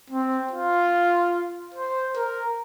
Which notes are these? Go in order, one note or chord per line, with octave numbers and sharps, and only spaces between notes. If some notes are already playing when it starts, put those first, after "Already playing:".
C4
F4
C5
A#4